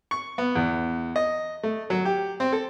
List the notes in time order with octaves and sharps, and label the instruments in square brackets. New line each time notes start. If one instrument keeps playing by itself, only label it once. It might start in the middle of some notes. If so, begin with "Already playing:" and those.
[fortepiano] C#6
B3
E2
D#5
A3
F#3
G4
C4
A4